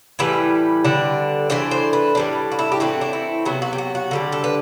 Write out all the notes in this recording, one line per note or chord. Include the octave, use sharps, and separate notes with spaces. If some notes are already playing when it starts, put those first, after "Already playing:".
A2 E3 G3 B4
D3 G3 D4
E3 A3 D4 C5
C5
B4
A2 G3 D4
F#4
E4
G4
E3 A3 C4 F#4
D4
E4
C3 F#3 B3 F#4
F#4
G4
F#4
F#4
D3 G3 D4
A4
B4